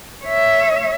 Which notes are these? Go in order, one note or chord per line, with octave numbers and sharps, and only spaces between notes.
C#5 E5